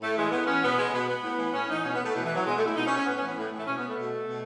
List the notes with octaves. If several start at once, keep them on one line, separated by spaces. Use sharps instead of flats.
A2 A3
E3 G#3
A2 B3
E3 C#4
B2 B3
G#3
B2 B3
B3
A2
E3
A2 C#4
E3 D#4
B2 C#4
B3
A3
B2 E3
E3
F#3
B2 G#3
A3
E4
B2 D#4
C#4
C#4
A2 B3
C#4
E3
B3
A2
E3 A3
B2 C#4
B3
A3
B2
B2